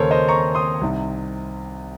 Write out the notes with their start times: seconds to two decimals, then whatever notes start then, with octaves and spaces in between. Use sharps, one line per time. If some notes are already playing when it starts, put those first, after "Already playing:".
Already playing: D#2 C#3 A4 A#4 C5 C#5
0.11 C5 D#5
0.28 A#5 C#6
0.55 C6 D#6
0.81 C2 C3 D#3